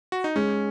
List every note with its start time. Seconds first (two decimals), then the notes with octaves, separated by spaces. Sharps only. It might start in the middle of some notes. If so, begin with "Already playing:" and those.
0.12 F#4
0.24 D#4
0.36 G#3 C#4